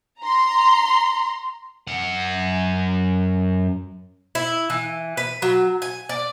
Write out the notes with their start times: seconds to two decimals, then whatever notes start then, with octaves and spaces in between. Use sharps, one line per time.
0.20 A#5 C6
1.87 F#2 F#5
4.35 E4
4.70 E3
5.17 B4
5.42 F#3
5.82 G#5
6.09 D5